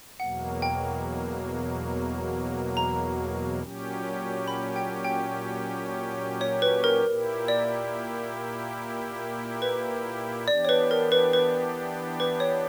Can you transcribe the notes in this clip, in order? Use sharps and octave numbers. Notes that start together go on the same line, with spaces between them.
E2 B2 F#3 A#3 F#5
G5
A#5
A#2 F#3 C#4 G4
B5
G5
G5
C#5
B4
A#4
A#2 A#3 E4 G4
D5
B4
E3 B3 D4 G4 D5
C#5
B4
A#4
B4
B4
B4
C#5